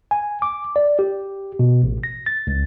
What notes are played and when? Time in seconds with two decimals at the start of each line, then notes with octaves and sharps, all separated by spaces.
0.11 G#5
0.42 D6
0.76 D5
0.99 G4
1.59 B2
1.83 A1
2.04 A#6
2.26 A6
2.47 C#2